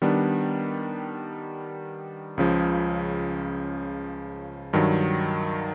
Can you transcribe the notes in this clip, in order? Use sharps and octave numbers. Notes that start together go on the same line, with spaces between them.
D#3 G3 B3 D4
C#2 C#3 F3
G2 D#3 F#3